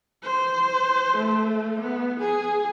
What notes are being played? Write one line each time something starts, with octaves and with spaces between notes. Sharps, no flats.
C5
A3
B3
G#4